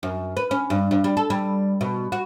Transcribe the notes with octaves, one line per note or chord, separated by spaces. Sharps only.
F#2
B4
C#4
G2
G2
G3
A4
G3
B2
F#4